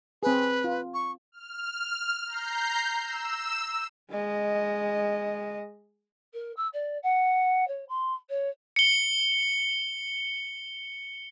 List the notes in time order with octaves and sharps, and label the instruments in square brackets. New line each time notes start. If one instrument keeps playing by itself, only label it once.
[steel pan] C4 G#4 [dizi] B4
[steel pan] F4
[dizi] C#6
[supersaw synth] F6
A#5 G6 C7
E6 E7
[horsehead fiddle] G#3 D#5
[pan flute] A#4
E6
D5
F#5
C#5
C6
C#5
[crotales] C#7 G7